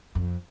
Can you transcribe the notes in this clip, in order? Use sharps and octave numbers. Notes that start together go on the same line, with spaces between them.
F2